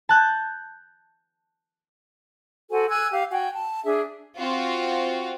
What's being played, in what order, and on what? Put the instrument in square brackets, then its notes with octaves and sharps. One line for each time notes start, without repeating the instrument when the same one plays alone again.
[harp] A5 F#6 G6
[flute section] F#4 A4 C5 G#5
G#5 E6 F#6 G#6
G4 F5
F#4 G5 G#5
A5
D4 G#4 E5
[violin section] C4 F4 F#4